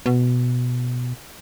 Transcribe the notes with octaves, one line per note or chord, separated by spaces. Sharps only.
B2